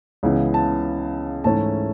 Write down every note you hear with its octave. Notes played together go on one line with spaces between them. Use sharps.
C#2 C#3 E3 B3 E4
A5
G#2 E3 A3 C#4 E4 A5